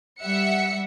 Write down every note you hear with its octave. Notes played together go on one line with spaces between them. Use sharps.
G3 E5 F#5 C#7